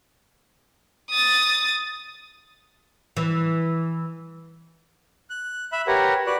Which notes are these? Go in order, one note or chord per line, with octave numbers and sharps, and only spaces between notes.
D#6 A6
E3
F#6
E5 B5 F#6
G4 A#4 B4 C#5 F#5
F#4 B4 D5 F#6